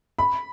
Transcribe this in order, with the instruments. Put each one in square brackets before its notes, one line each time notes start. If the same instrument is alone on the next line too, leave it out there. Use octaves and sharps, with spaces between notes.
[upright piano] B5